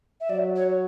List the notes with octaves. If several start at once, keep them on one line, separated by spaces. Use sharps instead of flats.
E5
F#3 D5
C#5